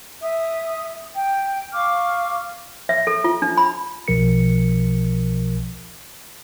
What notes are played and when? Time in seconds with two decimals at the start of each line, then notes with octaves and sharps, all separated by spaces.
0.22 E5 D#6
1.14 G5
1.73 F5 C#6 D6 F6
2.89 E5
3.07 A4
3.24 F4
3.42 D4
3.57 B5
4.08 B1 B2 F3 A#4 C#7